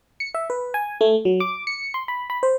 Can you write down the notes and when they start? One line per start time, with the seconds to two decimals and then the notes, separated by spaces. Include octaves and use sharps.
0.20 C#7
0.34 E5
0.50 B4
0.74 G#5
1.01 A3
1.25 F#3
1.40 D6
1.67 C#7
1.94 C6
2.08 B5
2.30 B5
2.43 C5